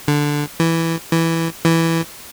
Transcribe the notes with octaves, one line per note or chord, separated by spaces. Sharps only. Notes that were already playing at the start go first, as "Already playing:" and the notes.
D3
E3
E3
E3